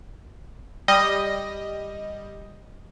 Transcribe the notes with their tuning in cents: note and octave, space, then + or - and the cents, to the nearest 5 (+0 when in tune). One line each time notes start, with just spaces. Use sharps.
G3 +10 D#5 +0